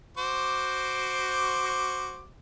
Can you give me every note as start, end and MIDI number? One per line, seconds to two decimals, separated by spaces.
0.17 2.26 66
0.17 2.26 72
0.17 2.26 86